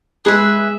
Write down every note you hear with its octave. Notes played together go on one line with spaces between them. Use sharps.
G#3 G#4 B4 E5